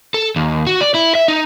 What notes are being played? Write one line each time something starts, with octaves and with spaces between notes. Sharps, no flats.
A4
D#2
F#4
D5
E4
E5
D#4